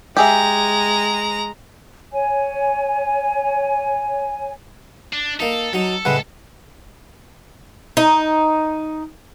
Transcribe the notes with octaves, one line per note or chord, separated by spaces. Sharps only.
G#3 G4 G#4 E5 A#5
C#5 G#5
D4
A#3 D#4 A4
F#3 D#4 A4
A2 C#3 G#3 A3 B4 F#5
D#4